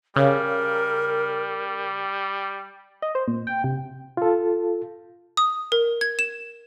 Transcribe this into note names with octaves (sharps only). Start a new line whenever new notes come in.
C#3 G3 A#4
D#5
C5
A#2
G5
C3
F4 A4
D#6
A#4
G#6
E7